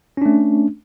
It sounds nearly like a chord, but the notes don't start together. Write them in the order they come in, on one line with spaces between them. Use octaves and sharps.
C#4 D4 A3